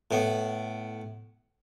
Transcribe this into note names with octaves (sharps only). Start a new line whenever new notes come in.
A2 B3